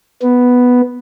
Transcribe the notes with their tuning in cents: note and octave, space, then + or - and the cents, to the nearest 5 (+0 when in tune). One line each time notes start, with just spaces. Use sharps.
B3 +0